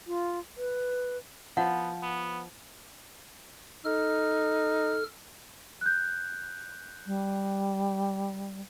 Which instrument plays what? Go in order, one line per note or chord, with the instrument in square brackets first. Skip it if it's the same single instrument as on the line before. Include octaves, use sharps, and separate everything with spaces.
[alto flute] F4
B4
[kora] F3 [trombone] B3 [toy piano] F#5
[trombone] B3
[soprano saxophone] D#4 [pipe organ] A4 F6
[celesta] F#6 G6
[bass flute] G3